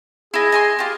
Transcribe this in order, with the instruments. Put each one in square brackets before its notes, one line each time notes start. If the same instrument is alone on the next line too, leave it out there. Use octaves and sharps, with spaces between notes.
[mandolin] E4 D#5 [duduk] G#4
[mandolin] D#5 G#5 C6
F4 G4